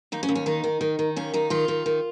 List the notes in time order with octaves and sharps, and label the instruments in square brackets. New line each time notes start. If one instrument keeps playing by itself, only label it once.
[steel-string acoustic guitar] D#2 D#4
C#4
D#2
C#4
D#3 D#4
D#3
D#3
D#3
D#2 C#4
D#3 D#4
D#3 F4
D#3
D#3